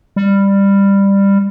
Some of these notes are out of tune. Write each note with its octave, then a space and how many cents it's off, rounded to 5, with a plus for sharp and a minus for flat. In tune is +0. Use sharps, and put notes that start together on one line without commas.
G3 +15